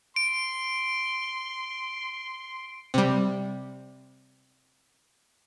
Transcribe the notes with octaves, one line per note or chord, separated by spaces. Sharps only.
C6 D7
C3 G3